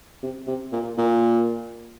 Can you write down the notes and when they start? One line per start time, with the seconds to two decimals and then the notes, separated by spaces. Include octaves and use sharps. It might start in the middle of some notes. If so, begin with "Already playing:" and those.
0.23 C3
0.47 C3
0.72 A#2
0.98 A#2